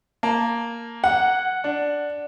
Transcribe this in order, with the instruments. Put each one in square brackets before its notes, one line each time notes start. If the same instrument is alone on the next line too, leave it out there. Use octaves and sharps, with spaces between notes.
[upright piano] A#3 A5
[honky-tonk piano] F#5
[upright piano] D4